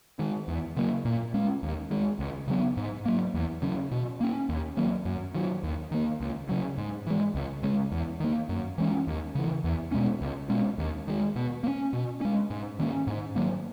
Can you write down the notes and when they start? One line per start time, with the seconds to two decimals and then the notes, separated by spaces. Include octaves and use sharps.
0.19 D#3 G#3
0.48 E2
0.77 C#3 F#3 A#3
1.05 A#2
1.34 G#3 C#4
1.63 D#2
1.91 D#3 G#3
2.19 C#2
2.47 C#3 F#3 B3
2.77 G#2
3.06 F#3 A#3
3.34 E2
3.62 C#3 F#3 C#4
3.91 B2
4.20 A#3 C#4
4.49 D#2
4.77 D#3 F#3 A#3
5.05 F#2
5.35 D#3 F#3
5.63 D#2
5.91 D#3 A#3
6.20 C#2
6.49 C#3 F#3
6.78 G#2
7.07 E3 G#3
7.35 C#2
7.63 C#3 G#3 C#4
7.91 E2
8.20 D#3 A#3
8.49 F#2
8.78 E3 G#3 C#4
9.07 D#2
9.35 C#3 E3
9.64 E2
9.92 B2 G#3 C#4
10.21 C#2
10.50 B2 G#3 C#4
10.78 D#2
11.07 D#3 G#3
11.36 B2
11.64 A#3
11.68 C#4
11.93 B2
12.21 G#3 C#4
12.50 G#2
12.79 D#3 A#3 C#4
13.07 G#2
13.36 D#3 F#3 A#3